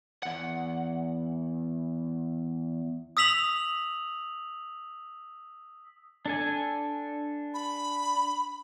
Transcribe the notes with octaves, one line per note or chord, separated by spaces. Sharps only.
E2 F#5
D#6 E6 B6 F7 F#7
D4 A4 G#5
B5